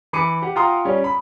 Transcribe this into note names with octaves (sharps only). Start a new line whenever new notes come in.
E3 B5 D6 C#7 D#7
G4 F#5
F4 F#5 G5 A#5 C6 D#6
G3 C#4
B5